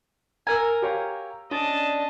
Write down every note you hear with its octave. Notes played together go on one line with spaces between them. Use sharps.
A#4 G#5 A#5 E6
G4 C#5 F5
C#4 D4 D#5 A5